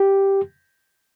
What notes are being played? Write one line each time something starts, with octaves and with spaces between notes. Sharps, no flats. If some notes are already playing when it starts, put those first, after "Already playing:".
Already playing: G4